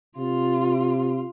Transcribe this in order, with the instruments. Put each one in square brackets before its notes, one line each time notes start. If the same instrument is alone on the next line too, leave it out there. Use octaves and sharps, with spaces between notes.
[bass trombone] C3 [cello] F4